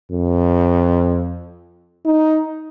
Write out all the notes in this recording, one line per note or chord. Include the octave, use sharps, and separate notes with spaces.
F2
D#4